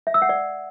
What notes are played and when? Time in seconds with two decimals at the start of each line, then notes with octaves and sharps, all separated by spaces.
0.07 E5
0.14 E6
0.22 F#5
0.29 D5